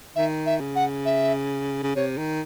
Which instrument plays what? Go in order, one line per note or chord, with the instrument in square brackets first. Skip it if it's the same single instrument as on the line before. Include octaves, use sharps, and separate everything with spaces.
[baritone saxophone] D#3 [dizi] E5
[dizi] E5
[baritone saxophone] C#3
[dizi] F#5
E5
[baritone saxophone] C#3
[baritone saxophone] C3 [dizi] C#5
[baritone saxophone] D#3